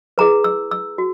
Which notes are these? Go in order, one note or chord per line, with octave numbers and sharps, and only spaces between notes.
E4 G#4 B4 A#5
E6
E6
F#4